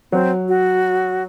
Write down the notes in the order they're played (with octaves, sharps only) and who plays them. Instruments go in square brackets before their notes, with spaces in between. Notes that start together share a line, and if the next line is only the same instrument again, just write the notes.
[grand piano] F#3 [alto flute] C4
[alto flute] F#4